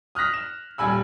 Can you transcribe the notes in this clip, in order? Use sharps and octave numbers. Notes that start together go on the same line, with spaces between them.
D#6 F6 F#6 A#6 B6
E7
D#1 G3 G#5 B5 E6